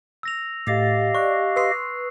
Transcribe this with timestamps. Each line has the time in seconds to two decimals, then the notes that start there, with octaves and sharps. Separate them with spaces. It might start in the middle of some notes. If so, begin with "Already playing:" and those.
0.23 E6 A#6 F7
0.67 A2 G4 D#5 F5 A6
1.15 D5 C#6 F#6
1.56 B4 C6 D#6 E6 C7